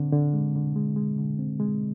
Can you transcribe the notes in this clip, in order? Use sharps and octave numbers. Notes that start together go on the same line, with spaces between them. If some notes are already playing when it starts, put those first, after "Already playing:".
Already playing: D3 C4
D3
G#3
D3
G#3
G#3
D3
C4
G#3